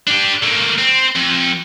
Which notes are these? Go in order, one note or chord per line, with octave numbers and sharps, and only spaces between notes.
D4 G4
A3 A#3
C4
F2